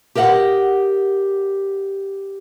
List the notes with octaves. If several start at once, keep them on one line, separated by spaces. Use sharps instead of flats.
G4 A#4 D#5 E5 F#5